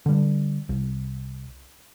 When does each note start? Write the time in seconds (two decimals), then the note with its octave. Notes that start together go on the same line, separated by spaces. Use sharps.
0.06 D3 G3
0.69 C2